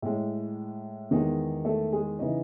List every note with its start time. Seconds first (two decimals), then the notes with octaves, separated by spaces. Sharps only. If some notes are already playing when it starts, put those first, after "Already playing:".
0.02 A2 G#3
1.11 E2 D#3 G#3 D#4
1.65 A3 A4
1.92 G#3 G#4
2.19 C#3 E3 D#4 D#5